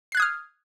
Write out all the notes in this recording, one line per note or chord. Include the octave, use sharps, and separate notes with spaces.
D#6 F6 F#6 G#6 C7